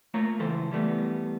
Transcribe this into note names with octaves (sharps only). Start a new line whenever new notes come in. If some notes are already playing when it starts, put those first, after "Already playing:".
A3 A#3 F4 C#5 A#5
C#2 E3 A4 C5
E3 G3 A3 B3